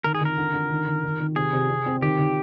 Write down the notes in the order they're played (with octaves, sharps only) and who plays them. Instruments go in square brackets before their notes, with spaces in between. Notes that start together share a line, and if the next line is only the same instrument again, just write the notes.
[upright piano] D#3 [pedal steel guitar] A#4
[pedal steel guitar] G#4
[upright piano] D#3 [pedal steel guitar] A#4
[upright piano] D3
D3
D#3
D#3
D#3
D#3
[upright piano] C3 [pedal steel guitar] G#4
[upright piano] C3
C3
C4
[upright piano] D#3 [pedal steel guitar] G4
[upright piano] D#3